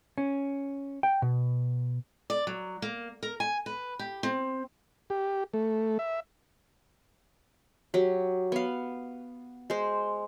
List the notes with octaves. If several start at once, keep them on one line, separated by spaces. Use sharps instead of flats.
C#4
G5
B2
D5
F#3
A#3
A#4
G#5
B4
G4
C4
G4
A3
E5
F#3 G4
B3 F5
G#3 C5